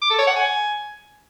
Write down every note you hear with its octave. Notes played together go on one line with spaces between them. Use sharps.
D6
A4
C#5
F#5
G#5